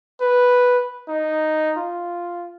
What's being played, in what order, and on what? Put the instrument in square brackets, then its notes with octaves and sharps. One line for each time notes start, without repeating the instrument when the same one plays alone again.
[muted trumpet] B4
D#4
F4